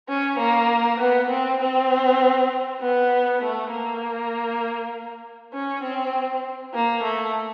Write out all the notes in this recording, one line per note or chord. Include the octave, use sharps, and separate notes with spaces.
C#4
A#3
B3
C4
C4
B3
A3
A#3
C#4
C4
A#3
A3